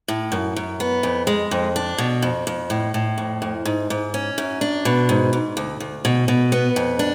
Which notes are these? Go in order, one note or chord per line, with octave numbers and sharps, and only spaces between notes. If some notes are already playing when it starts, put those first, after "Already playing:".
A2
F#2
F#2
B3
F2
G#3
F2
D4
B2
F2
F2
A2
A2
F2
F2
G#2
G#2
C#4
F#2
D4
B2
G#2
G#2
D2
D2
B2
B2
B3
F2
D4